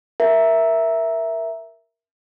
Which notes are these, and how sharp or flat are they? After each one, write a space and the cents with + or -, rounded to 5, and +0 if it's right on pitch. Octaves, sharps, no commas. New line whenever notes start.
A#4 +5 E5 +0